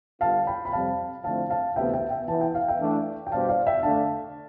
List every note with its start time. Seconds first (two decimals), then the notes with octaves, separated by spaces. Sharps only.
0.21 D3 G3 B3 F4 F5 A5
0.47 G5 B5
0.65 B5
0.73 F2 C3 G3 C4 F5 A5
1.24 D3 F3 A3 C4 E4 F5 A5
1.50 F5 A5
1.76 D2 C3 E3 B3 E5 G5
1.94 E5 G5
2.11 E5 G5
2.28 E3 B3 E4 A5
2.41 G5
2.55 F5
2.68 E5 G5
2.80 E3 A3 D4
3.27 G5
3.32 B2 G3 D4 G4 C5 F5 A5
3.49 D5 F5
3.67 E5 G5
3.83 D3 A3 D4 F5 A5